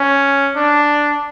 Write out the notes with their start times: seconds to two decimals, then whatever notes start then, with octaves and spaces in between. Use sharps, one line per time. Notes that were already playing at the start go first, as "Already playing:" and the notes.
Already playing: C#4
0.56 D4